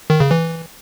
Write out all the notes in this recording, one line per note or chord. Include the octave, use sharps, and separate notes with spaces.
D#3
C#3
E3